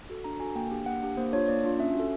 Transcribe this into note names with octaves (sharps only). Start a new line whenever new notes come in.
F#4 A4
D4 A#5
F#4 A4 G#5
A#3 G5
D4 G4
A#3 F#5
D4 G4
A#3 C5
D4 F4 C#5
A#3 D5
D4 F4
C#4 E5
F#4 A4